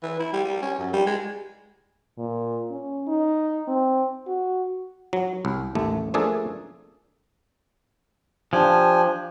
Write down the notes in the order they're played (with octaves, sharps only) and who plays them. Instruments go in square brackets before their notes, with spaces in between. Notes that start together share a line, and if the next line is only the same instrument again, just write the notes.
[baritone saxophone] E3
E4
G3
G3
C#4
F#2
G3
G#3
[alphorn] A#2
C#4
D#4
C4
F#4
[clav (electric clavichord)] F#3
C2
A1 D#2 A3
F3 A3 A#3 D4 G#4 A4
[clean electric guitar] F3 [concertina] D4 G4 G#5